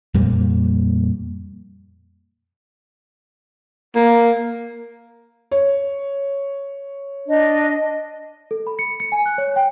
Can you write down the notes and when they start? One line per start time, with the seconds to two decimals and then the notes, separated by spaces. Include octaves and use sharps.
0.14 F2 A#2 G3 A#3
3.96 A#3
5.51 C#5
7.28 D4 D#5
8.51 A4
8.67 B5
8.79 C#7
9.00 C#7
9.12 G#5
9.26 F#6
9.38 C#5
9.56 G5